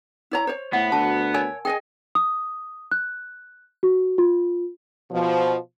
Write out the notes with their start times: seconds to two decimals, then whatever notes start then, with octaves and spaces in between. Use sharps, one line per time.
0.31 E4 C#5 A#5
0.47 C5 C#5
0.73 A2 B3 F#5
0.92 D2 F#4 A5
1.34 A#4 C#5 G#5
1.65 G#4 D#5 G5 G#5
2.15 D#6
2.92 F#6
3.83 F#4
4.18 F4
5.11 B2 F3